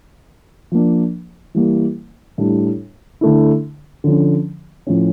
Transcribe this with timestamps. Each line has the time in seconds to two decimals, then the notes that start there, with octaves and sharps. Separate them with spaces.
0.72 F3 A#3 D4
1.54 E3 G3 A#3
2.38 A2 G3 D4
3.21 D3 A3 E4
4.04 D3 F3 C#4
4.87 A2 F3 C#4